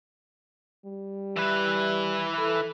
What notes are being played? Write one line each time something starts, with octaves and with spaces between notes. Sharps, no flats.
G3
E3 B4
A4